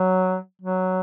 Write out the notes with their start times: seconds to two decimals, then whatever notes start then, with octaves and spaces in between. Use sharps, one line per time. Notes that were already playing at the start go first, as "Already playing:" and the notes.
Already playing: F#3
0.62 F#3